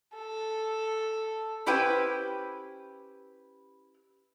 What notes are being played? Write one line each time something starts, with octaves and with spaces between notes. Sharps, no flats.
A4
C#4 E4 G4 B4 C5 G5